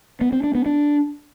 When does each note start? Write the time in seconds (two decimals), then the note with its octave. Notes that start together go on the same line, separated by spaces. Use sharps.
0.21 B3
0.32 C4
0.44 D4
0.55 B3
0.66 D4